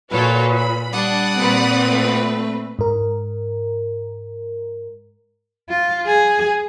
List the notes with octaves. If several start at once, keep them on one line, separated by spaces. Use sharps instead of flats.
A#2 F#4 A4 B4 C#5
B5
G3 D4 D5 F#5 D#6
A#2 C4 B4
A3
G#2 A#4
F4
G#4